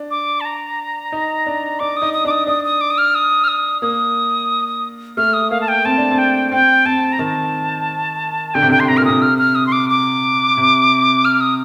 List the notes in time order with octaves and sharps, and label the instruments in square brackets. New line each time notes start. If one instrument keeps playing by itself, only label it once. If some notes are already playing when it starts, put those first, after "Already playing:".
Already playing: [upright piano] D4
[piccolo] D6
A5
A#5
[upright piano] D#4
D4
[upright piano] D4 [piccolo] D6
[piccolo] D#6
[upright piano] D#4
[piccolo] D#6
[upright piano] D4 [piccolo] D6
[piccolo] D#6
[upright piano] D4 [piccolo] D#6
[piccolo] D#6
D6
D#6
F6
D#6
F6
D#6
[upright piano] A#3 [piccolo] D#6
[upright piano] A3 [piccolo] F6
[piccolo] D#6
[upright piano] A#3 [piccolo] F5
[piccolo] A5
G5
[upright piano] C4 [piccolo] A5
[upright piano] D4
C4
[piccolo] G5
[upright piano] C4 [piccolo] G5
[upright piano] C4 [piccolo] A5
[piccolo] A#5
[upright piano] D#3 [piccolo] A5
[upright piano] D3 [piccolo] G5
[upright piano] C3
[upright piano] D3 [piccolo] G5
[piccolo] C6
[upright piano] C3 [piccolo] A#5
[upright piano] A#2 [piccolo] F6
[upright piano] C3 [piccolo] D#6
[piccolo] F6
F6
D#6
C6
D6
D6
[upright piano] C3
[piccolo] F6
D#6